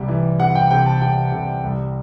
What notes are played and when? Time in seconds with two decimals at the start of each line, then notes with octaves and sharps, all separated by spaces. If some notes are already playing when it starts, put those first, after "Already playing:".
Already playing: C2 C3 G3
0.08 E3
0.40 C3 F#5
0.55 G5
0.71 C3 G5
0.86 A5
1.01 C3 G5
1.32 C3
1.64 C2